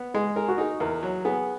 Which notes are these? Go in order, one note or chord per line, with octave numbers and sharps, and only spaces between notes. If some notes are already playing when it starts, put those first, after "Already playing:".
Already playing: B3
G#3 G#4
G#4 A#4
F#4
D#4 G#4
E2 A#4
F#3
B3 G#4